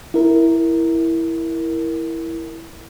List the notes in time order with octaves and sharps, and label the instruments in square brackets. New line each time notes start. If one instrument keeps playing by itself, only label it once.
[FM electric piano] E4 A#4